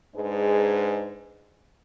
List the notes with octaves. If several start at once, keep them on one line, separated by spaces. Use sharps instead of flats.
G#2 G#3 D4 G#4 B4